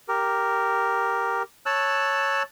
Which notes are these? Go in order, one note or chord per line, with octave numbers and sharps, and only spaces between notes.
G4 A#4
C#5 A5 E6 F#6